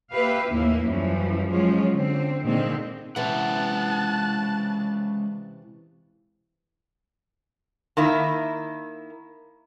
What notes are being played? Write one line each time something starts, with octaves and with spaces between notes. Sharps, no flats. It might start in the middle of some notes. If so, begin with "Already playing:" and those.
A#3 G4 B4 E5 F5
D#2 A2 E3 A#3 E4
F#2 E3 F3 G3
F3 F#3 G#3 C#4 F4
D3 C4
A#2 D3 D#3 G#3 C4
C3 E3 G#3 C#4 F#5 A5 F#6
D#3 A#3 E4